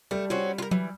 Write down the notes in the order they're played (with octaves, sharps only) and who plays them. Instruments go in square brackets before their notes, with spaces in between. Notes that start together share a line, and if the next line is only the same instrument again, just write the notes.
[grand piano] G3 [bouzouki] A3
[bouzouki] C4 C#4 F#4 [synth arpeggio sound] F4
[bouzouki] F4 A#4
[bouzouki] E3 [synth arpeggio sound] F#3